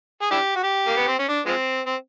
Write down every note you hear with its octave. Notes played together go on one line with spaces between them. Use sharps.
G#4
D4 E4 G4
F#4
G4
A#3
B3
C4
C#4
D4
F3 G#3 C4
C4